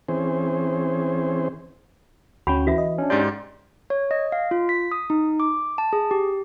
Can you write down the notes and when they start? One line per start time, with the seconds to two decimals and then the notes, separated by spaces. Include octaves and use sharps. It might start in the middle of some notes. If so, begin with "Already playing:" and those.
0.09 E3 C4 C#4 G#4 C5
2.47 D2 C#4 F#4 G5 B5
2.67 E3 F#4 E5
2.78 D#5
2.98 C#4 D4
3.10 G#2 G4 D5 C6 G6 A6
3.90 C#5
4.11 D#5
4.32 F5
4.51 F4
4.69 B6
4.92 D#6
5.10 D#4
5.40 D6
5.78 A5
5.93 G#4
6.11 G4